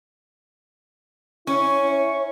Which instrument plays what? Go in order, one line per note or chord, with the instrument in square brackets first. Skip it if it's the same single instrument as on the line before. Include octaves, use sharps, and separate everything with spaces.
[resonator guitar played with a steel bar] C#4 [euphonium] E4 [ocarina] C#5 [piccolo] C#6